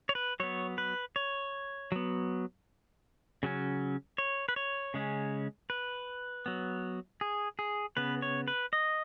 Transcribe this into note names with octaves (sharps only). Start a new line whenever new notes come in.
C#5
B4
F#3 B3 C#5
B4
C#5
F#3 B3
C#3 F#3 C#4
C#5
B4
C#5
C#3 G#3 C#4
B4
F#3 B3
G#4
G#4
C#3 B3 B4
C#5
B4
D#5